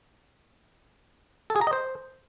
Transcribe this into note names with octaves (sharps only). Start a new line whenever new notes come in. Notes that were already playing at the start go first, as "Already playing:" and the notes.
A4
G#4
A#5
D#5
C5